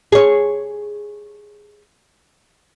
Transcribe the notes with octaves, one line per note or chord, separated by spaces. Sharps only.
G#4 C#5